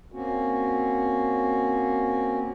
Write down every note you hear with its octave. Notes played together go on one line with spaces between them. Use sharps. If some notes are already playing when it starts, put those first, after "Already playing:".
A#3 C4 C#4 F#4